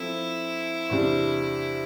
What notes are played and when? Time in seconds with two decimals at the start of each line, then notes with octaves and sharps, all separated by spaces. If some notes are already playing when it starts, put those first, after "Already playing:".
Already playing: F3 C4 E4 A4
0.89 E2 C3 G3 D4